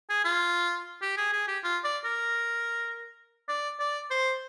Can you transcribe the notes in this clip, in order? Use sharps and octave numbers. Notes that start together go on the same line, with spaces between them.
G#4
F4
G4
G#4
G#4
G4
F4
D5
A#4
D5
D5
C5